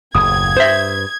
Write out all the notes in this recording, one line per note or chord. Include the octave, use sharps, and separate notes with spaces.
F#1 D#2 A2 D#6 G#6
G2 C5 E5